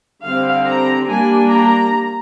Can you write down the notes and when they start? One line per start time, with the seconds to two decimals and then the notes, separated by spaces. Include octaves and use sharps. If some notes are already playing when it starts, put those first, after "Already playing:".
0.23 D3 G3 C4 F5
0.66 A#5
1.08 G3 A#3 D4 G#5
1.51 A#5